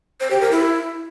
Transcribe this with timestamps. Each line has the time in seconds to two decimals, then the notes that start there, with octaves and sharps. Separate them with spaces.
0.20 C5
0.31 G4
0.41 A#4
0.51 E4